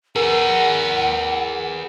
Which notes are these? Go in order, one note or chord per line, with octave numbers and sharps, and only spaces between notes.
G#4 A#4 B4 F#5